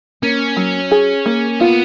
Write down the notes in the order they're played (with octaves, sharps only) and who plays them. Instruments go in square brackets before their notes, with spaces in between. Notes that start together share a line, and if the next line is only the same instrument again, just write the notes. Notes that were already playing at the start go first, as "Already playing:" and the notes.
[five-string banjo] A#3 [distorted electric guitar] C#4
[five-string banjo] F#3
G#4
A#3
[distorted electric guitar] B3 [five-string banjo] F4